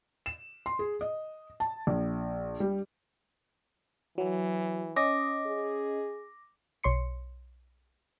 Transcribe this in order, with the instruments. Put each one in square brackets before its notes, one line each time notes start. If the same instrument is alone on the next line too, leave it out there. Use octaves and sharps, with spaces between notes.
[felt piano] E7
C6
G#4
D#5
A5
A#1
G3
[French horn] E3 [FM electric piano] F#3
[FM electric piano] C#4 D#5 [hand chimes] D6 A#6
[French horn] G#4
[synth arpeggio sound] B1 C#5 C6 C#7